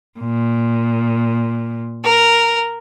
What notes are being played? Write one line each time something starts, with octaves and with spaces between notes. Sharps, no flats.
A#2
A#4